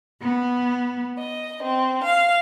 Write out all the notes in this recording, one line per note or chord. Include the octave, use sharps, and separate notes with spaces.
B3
D#5
C4
F5